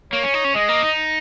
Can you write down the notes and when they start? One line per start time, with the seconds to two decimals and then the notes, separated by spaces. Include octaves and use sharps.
0.13 A#3 C#5
0.23 C#4
0.34 D#4
0.44 C#4
0.55 G#3 D#5
0.69 A#3
0.83 D#4